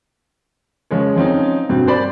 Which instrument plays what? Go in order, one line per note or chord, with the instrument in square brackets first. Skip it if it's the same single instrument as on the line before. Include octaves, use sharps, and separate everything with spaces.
[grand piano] C#3 F3 G#3 C#5
F3 C4 C#4 D#4
G2 B2 C4
C5 D5 B5